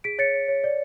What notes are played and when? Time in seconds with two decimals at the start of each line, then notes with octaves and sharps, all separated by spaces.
0.04 G#4 B6 D7
0.19 C#5 A6 C#7
0.34 C#5
0.48 C#5
0.64 D5